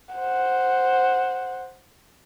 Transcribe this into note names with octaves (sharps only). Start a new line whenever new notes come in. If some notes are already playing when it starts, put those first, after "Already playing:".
C5 F#5